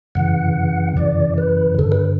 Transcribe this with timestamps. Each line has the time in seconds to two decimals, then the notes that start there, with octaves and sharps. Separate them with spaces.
0.15 F#2 C#3 E3 F#5
0.97 F#2 C#3 E3 D5
1.38 B4
1.79 G2 D3 A4
1.92 B4